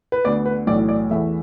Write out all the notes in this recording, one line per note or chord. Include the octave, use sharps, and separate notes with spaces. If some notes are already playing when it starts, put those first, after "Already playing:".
B4
D2 D3 B3 D5
B4
B1 A2 E3 A3 D5
D5
E2 E3 A3 E5